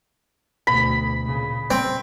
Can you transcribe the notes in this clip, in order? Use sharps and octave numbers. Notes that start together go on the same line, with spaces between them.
D2 B2 B5
A#2 C#3
C4